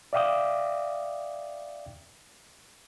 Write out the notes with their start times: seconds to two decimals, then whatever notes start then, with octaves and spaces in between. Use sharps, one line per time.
0.13 D5 E5 F5 G5 D6 D#6